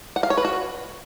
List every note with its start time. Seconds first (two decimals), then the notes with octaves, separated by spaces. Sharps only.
0.16 F#5
0.23 F5
0.30 C#5
0.37 B4
0.45 F#4